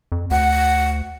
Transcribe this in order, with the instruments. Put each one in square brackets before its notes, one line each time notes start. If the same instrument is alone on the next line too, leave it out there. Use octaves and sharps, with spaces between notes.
[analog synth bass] F2
[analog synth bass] D2 [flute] F#5